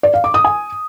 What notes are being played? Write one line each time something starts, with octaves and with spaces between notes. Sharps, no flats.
D5
F5
D6
D#6
G#5